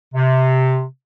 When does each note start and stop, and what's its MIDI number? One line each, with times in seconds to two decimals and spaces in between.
0.14 0.83 48